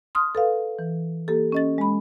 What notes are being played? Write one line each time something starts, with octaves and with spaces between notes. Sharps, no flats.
C6 D#6 F6
A4 B4 F5
E3
A#3 G4 A4
C#4 D#5 A6
G#3 B5